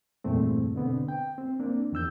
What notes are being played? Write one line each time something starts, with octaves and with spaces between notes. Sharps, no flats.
E2 G2 A#2 A3 C4
B2 D3 B3 C4
G5
C4
A#3 C4 D4
E2 D#3 E6 G6